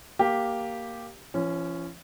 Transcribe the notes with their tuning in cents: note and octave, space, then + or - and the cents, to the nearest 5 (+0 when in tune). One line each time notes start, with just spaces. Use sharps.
A#3 +0 G4 +0
F3 -45 C#4 +0